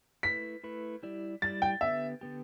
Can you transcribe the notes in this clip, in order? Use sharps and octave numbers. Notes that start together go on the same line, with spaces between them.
A3 E4 B4 B6
A3 E4 B4
G3 E4 G4 D5
G3 E4 G4 D5 A6
G5
D3 B3 G4 E5
D3 B3 G4